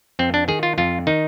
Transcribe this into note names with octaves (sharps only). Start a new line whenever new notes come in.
F2 C4
D4
D#3 G#4
F4
F2 F4
D#3 D#4